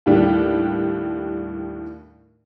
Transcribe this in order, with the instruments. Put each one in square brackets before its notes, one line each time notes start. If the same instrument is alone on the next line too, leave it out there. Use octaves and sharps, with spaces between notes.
[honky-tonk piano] D#2 A2 G3 D4